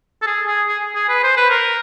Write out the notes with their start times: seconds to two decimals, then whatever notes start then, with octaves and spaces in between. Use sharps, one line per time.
0.22 A4
0.27 G#4
0.47 G#4
0.68 G#4
0.95 G#4
1.09 B4
1.23 C5
1.37 B4
1.50 A#4